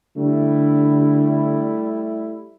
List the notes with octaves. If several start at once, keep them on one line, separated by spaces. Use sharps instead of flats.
D3 G3 A3 E4